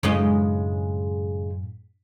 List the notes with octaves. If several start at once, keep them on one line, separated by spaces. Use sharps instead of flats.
F#2 A2 C#3 G#3 D#5